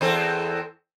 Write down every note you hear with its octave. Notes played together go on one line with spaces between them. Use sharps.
E2 C4 A4